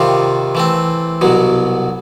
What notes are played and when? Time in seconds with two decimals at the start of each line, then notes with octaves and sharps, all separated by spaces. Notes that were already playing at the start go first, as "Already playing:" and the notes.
Already playing: C3 D#3 G3 C4 F4
0.55 E3 A3 C4
1.21 C2 B2 F#3